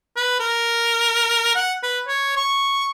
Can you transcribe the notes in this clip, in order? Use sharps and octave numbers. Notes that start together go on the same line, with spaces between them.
B4
A#4
F#5
B4
C#5
C#6